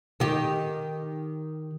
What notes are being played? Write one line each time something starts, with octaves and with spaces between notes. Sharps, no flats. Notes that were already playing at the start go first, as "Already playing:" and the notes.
D#3 G4